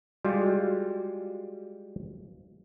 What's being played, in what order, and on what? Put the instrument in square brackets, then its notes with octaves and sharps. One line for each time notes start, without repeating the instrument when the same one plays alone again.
[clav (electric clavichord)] G3 G#3 F4 [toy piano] F#4 G#4